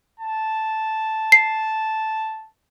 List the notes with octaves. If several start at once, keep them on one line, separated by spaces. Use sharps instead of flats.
A5
C7